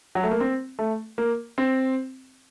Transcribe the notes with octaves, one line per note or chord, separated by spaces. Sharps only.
F#3
A3
A#3
C4
A3
A#3
C4